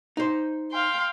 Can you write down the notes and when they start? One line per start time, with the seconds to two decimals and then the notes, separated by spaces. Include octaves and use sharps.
0.17 D#4 C5
0.70 F5 G5 C6